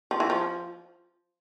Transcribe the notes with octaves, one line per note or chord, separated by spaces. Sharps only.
F3
E3
F3